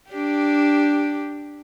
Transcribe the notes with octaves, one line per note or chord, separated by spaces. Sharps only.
D4 G4